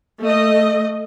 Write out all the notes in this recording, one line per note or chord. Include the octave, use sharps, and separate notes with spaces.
A3 D#5